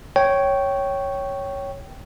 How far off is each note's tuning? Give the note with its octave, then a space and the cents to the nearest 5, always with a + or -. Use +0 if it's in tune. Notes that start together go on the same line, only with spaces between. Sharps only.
C#5 +0 G5 -15